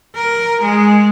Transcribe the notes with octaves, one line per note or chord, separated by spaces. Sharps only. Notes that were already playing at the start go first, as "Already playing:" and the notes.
A#4
G#3